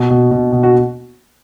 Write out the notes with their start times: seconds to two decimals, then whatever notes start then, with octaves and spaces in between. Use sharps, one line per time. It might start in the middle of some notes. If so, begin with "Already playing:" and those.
Already playing: B2
0.10 B2
0.31 B2
0.52 B2
0.63 F#4